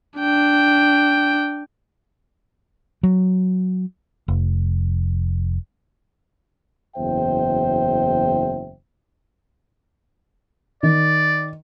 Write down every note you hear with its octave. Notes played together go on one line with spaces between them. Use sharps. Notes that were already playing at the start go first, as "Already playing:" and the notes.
D4 G5
F#3
F1
F#1 E2 C5 E5 G5
D#3 D5